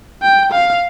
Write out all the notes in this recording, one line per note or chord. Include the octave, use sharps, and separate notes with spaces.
G5
F5